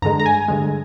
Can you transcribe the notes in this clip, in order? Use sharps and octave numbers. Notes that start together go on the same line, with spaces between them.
G2 D3 G#3 A#5
A#5
G#5
G2 D3 G#3